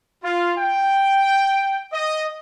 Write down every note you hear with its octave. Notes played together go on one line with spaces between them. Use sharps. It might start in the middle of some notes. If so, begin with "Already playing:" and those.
F4
G5
D#5